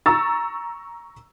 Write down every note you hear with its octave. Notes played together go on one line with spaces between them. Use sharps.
A#5 C#6 E6 A6